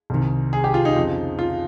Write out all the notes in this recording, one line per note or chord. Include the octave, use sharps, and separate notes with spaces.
C2 C3 D#3
G#4
G4
F4
D#4
F2 C#3 F3
F4